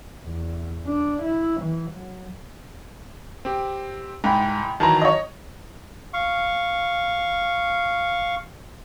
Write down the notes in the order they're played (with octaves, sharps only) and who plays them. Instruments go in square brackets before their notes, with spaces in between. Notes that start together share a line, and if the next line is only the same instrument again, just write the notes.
[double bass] E2
D4
E4
E3
F#3
[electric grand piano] C4 G4
[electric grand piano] C2 G5 B5 [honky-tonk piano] G#2
[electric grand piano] D#3 E3 F#3 [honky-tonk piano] A5 A#5
[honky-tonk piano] C#5 D#5
[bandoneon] F5 C#6